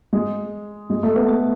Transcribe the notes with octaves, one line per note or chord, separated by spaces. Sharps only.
G#3
G#3
A3
B3
A3